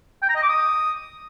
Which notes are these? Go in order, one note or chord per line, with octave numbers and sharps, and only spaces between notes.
G5
A#5
D#5
D6
D#6